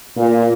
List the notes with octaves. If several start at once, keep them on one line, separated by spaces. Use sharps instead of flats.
A#2